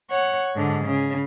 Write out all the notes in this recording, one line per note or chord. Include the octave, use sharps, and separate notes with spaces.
C#5 F#5
G#2 D3
C#3